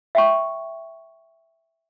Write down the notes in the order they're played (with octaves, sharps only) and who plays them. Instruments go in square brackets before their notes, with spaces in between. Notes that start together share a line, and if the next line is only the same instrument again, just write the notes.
[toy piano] E5 G5 C#6